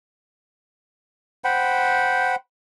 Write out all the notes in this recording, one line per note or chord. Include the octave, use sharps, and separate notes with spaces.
C5 F#5 G5 B5